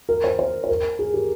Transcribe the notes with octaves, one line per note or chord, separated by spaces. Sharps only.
A#4
C5
C5
C5
A#4
G#4
G4